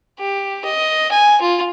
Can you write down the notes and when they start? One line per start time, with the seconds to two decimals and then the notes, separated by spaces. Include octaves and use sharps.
0.20 G4
0.65 D#5
1.11 G#5
1.41 F4